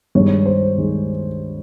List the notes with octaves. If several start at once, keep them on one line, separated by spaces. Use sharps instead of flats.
G2 D#3 G#3 C#5
C5
D#3 G#3